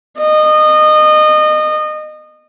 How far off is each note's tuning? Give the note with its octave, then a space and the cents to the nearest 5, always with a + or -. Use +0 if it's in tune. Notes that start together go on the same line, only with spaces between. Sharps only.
D#5 -25